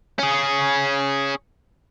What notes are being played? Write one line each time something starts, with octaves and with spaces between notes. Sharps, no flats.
C#4 G#4